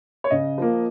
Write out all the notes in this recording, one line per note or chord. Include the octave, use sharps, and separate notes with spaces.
C#5
C#3 D#5
F3 A#3